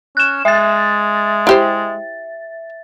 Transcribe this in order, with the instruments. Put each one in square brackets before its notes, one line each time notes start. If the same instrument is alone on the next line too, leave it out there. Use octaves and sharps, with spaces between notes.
[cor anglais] C#4 [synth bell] F#6 E7
[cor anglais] G#3 [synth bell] E5 A6
[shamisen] E4 G4 C5